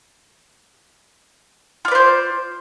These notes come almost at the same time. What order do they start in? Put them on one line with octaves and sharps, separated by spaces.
F4 D5 B4 C5